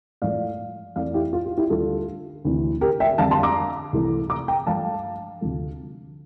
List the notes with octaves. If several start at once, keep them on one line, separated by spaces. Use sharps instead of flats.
A2 F3 A3 D5 F5
F2 E3 A3 D5 F5
E4 G4
F4
F4
E4 G4
D2 D3 G3 F4 A4
D2 C3 E3
G4 A#4
E5 G5
F2 D3 G3 F5 A5
A5 C6
A#5 D6
C2 C3 E3 A3
A#5 D6
G5 A#5
G2 F3 A3 F5 A5
D2 C3 F3 A3